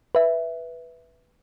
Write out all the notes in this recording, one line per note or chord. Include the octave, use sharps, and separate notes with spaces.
B4 E5